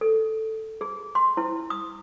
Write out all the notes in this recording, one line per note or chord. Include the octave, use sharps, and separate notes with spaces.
A4
G#4
C6
E4
D#6